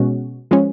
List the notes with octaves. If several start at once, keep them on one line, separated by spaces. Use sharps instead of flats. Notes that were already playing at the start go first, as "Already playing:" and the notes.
Already playing: B2 G#3 C#4 F#4
F3 G#3 C#4